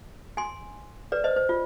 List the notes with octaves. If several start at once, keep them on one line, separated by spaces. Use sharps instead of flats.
G#5 C6
B4 D5
C5 D#5
C5
F4